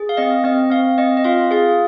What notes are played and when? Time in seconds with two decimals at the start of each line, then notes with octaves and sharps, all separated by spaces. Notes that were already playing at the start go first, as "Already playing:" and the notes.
Already playing: G#4
0.09 F5
0.17 C4 D#5
0.44 C4 D#5
0.70 C4 F5
0.98 C4 D#5
1.17 D#5
1.24 F4 F5
1.51 G#4 F5